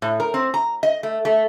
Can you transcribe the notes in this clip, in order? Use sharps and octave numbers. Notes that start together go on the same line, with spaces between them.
A2
A#4
C4
A#5
D#5
A3
A3